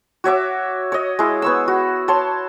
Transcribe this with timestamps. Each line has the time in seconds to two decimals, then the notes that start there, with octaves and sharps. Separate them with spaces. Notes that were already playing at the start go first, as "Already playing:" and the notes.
0.24 F#4 C#5 E5 D6
0.92 C#5 D#5
1.19 G#3 E4
1.42 B3 C#6 E6
1.68 F#4
2.08 C#5 A5 C6